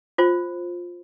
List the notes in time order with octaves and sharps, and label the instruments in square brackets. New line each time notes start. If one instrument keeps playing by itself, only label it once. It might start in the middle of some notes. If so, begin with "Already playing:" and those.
[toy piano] F4 C5